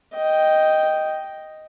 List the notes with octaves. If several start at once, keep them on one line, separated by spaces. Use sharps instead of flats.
D#5 G5